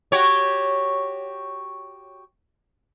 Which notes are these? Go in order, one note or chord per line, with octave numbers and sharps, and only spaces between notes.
F#4 G4 C#5